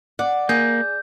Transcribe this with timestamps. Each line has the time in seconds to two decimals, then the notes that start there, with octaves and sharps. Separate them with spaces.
0.19 D5 F#5
0.49 A#3 G#4 G6